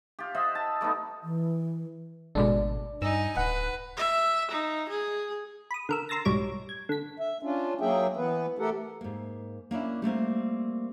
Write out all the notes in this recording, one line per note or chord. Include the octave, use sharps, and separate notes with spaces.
F4 G4
C5 D#5 E5 F#5
A5
G3 A3 B3 D#4
E3
G#1 B2 G#3 A3 D4 D5
G2 D#4 G#5 E6
D1 B4 F#5
E5
D#4
G#4
B5 D#6
D3 A#4 E6
A#5 C6 E6 A6 A#6
B1 G#2 G3 C#5 D7
G#6
D3 B6
E5
C#4 D4 F4
F#3 A#3 G#4 E5 G5
E3 B3 B4
A3 G4 A4 A#4 F#5
G#2 A#3
A#3 C#4 D4 E4
G3 A3 A#3 C4